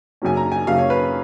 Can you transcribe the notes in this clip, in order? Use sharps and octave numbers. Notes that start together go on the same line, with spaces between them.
F#2 C#3 F#3 A#3 C#4 G#5
A#5
G#5
F#2 C#3 F#3 A#3 C#4 F5
C#5
B4